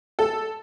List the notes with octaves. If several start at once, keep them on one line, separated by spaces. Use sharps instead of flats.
A4